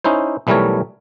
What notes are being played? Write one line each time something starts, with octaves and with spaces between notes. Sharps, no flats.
C#4 D#4 E4 C5
B1 E3 G3 A3 A#4 C#5